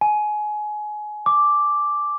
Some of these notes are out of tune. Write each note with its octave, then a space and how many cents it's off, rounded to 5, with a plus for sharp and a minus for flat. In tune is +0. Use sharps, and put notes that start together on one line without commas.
G#5 +25
D6 +0